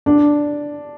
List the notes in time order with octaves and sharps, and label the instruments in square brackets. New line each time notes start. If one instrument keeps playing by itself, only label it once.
[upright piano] D4